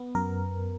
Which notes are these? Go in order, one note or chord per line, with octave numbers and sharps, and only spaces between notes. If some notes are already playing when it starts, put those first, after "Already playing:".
Already playing: B3
F#2 A#4